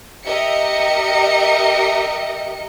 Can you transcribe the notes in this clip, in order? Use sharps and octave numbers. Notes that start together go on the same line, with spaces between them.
G4 A#4 D#5 E5 C#7